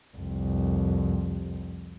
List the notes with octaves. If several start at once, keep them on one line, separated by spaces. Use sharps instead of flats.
C2 F2